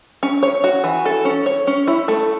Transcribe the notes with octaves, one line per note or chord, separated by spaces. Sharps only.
C#4
C#5
F#4
E3
A4
C#4
C#5
C#4
E4
A3